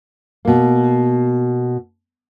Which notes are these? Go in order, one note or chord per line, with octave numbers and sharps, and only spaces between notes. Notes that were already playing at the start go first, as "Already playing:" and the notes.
B2 A#3